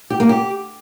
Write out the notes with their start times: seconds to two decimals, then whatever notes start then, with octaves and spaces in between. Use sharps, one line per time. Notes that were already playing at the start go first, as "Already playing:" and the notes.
0.10 G4
0.20 A#3
0.29 G4